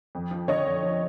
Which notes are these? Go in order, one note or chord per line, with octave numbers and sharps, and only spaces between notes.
F2
F3
D3 C#5 D#5
F2
F3